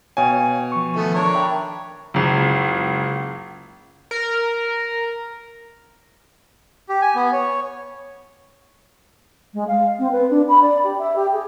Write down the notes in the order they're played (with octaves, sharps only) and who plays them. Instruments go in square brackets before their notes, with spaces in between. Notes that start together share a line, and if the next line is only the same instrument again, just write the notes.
[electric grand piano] B2 G#5 [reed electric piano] C#5 F5 G5
[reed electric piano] F3 C#6
[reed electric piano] D#3 F3 [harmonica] A3 B3
[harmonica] D4 A#4 C#5
[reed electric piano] E5 G5 B5
[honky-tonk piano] F#1 C#2
[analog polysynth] A#4
[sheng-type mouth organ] G4
G#5
B3
C#5
[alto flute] G#3
F5
C4
B4
D4
B5
D5
G4
E5
G4
G#4